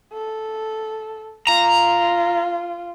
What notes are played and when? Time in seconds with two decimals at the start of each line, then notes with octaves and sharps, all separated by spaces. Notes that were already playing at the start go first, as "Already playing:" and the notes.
0.13 A4
1.48 F4 A#5